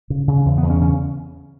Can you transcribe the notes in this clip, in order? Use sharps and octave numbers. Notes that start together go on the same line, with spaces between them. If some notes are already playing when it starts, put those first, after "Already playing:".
C#3
C#3
E2
B3
E2
C#4
C#3 C#4